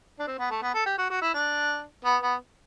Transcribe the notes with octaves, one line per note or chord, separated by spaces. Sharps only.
D4
C4
B3
A3
B3
A4
G4
F#4
F#4
E4
D4
B3
B3